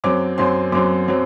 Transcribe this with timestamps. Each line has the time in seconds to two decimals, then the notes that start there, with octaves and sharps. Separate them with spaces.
0.04 F#2 F#3 C4 D6
0.38 F#2 F#3 C4 C6
0.72 F#2 F#3 C4 D6
1.08 F#3 C4